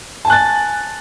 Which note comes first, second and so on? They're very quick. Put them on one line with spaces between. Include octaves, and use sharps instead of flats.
A5 G#5 F#6 A6